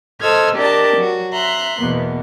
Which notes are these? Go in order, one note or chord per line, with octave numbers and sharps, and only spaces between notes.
A4 C5 D#5 E6 F6 G#6
D4 G4 A#4 D5 D#5 A5
F#3 F#4
E5 A#5 C6 F#6
E2 B2 A#3 B3